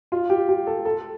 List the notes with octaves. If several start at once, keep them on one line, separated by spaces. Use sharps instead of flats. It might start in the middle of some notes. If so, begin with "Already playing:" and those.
F4
G4
G4
A4
A4